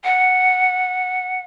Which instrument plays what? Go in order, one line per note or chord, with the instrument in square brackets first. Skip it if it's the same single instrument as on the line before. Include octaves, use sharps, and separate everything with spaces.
[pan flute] F#5